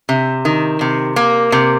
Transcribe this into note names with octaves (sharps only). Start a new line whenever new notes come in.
C3
D#3
C3
A#3
C3